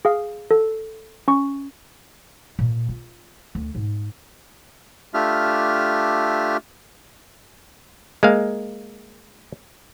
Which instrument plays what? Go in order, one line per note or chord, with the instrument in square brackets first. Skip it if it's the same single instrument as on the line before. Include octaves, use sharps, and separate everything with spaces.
[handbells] G#4 F5
A4
C#4 C#6
[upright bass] A#2
F4
D2
G#2
[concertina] A3 D4 F4 G4 E5 F6
[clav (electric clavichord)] G#3 A#3 F5